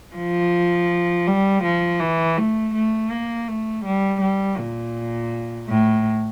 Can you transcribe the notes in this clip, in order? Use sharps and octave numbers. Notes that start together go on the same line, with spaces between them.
F3
G3
F3
E3
A3
A3
A#3
A3
G3
G3
A#2
A2